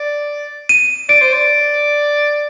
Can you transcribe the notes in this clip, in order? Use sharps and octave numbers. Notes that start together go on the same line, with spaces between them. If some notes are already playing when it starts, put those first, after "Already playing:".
Already playing: D5
D#7
D5 D7
C5
D5